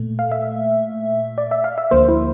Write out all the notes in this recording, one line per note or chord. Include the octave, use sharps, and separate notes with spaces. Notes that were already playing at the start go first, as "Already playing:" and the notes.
Already playing: A#2 A3
F5
E5
D5
E5
F5
E5
D2 D3 F3 A#3 C5
E4